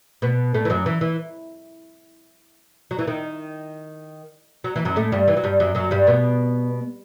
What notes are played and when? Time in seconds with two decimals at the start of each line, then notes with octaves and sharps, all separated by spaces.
0.22 B2 B3
0.54 A2 A3
0.65 E3
0.70 F#2 F#3
0.86 E3
1.01 E3
2.91 F#3
2.99 E3
3.07 D#3
4.64 F#3
4.76 E3
4.85 F#2 F#3
4.96 A2 A3
5.12 G2 G3
5.28 E3
5.37 F#3
5.44 G2 G3
5.60 F#2 F#3
5.75 F#2 F#3
5.91 G2 G3
6.07 B2 B3